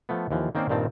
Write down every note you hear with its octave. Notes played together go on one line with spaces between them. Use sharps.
F3 A3 B3
D#2 E3 F3
D#3 A#3 C4 C#4 C5 D5
G2 A#2 D#3 C4 A5